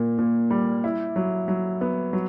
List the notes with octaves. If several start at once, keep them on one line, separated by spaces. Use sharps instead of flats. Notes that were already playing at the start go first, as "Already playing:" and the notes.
Already playing: A#2 A#3
A#2
G3
E4
F#3
F#3
B3
F#3